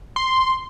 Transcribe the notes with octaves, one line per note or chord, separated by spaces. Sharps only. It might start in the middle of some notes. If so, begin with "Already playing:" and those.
C6